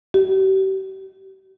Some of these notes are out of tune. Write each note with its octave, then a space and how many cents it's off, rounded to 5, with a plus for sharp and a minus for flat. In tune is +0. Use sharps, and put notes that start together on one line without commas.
G4 -35